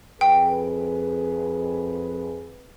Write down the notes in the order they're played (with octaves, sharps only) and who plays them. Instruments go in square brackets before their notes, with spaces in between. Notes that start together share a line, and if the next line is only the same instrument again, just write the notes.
[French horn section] F2 G#4 B4 [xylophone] G5